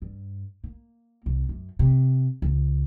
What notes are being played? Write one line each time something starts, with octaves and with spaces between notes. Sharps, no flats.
G2
A#3
C2
F#2
C3
C#2